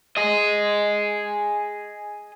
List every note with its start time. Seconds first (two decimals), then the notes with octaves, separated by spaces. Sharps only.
0.17 G#4 D#5